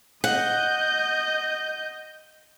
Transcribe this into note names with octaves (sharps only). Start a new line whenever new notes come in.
D#5 F#5 G6